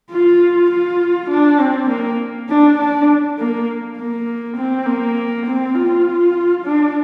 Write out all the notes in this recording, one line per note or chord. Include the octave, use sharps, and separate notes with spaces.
F4
F4
D4
C4
A#3
D4
D4
A#3
A#3
C4
A#3
C4
F4
D4